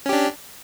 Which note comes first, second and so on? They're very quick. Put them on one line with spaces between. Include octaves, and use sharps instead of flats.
C#4 G4 D4